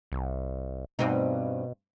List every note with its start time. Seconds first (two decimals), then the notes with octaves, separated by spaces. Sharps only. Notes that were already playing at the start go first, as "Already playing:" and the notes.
0.12 C2
0.99 G2 B2 C4 D#4